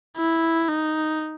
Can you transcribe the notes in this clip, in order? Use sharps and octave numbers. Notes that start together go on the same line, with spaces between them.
E4
D#4